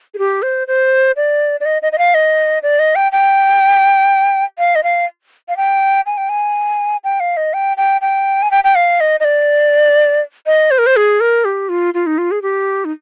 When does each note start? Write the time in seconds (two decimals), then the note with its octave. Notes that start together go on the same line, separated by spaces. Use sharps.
0.14 G#4
0.18 G4
0.42 C5
0.68 C5
1.16 D5
1.60 D5
1.66 D#5
1.82 D#5
1.92 D#5
1.98 F5
2.14 D#5
2.63 D5
2.79 D#5
2.95 G5
3.12 G5
4.59 F5
4.75 D#5
4.84 F5
5.49 F5
5.57 G5
6.06 G#5
6.17 G5
6.29 G#5
7.04 G5
7.20 F5
7.37 D#5
7.54 G5
7.77 G5
8.01 G5
8.42 G#5
8.51 G5
8.64 G5
8.75 F5
9.00 D#5
9.20 D#5
9.25 D5
10.46 D#5
10.71 C5
10.78 A#4
10.86 C5
10.96 G#4
11.20 A#4
11.45 G4
11.69 F4
11.94 F4
12.06 D#4
12.18 F4
12.31 G#4
12.42 G4
12.85 D#4